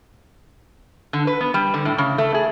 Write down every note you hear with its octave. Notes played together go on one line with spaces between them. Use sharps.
D3
B4
B3
G3
D3
A2
C#3
A3
G#4